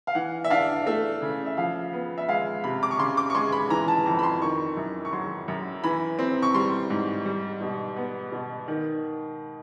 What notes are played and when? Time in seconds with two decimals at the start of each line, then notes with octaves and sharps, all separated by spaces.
0.07 F5
0.15 E3 F#5
0.44 E5
0.50 D4 F5
0.86 A3 E5
1.22 C#3
1.46 E5
1.57 F3 F5
1.93 B3
2.18 E5
2.29 G#3 F5
2.64 C3 B5
2.83 D6
2.91 C#6
2.99 C#3 C6
3.17 D6
3.30 C#6
3.35 G#3 C6
3.52 B5
3.70 E3 A#5
3.88 A5
4.06 F2 A#5
4.19 B5
4.23 C6
4.42 D#3 C#6
4.77 F#2
5.05 C#6
5.13 F#3 C6
5.48 F#2
5.84 E3 B5
6.19 C4
6.42 C#6
6.54 G3 C6
6.90 G#2
7.25 G3
7.61 B2
7.97 B3
8.32 B2
8.68 D#3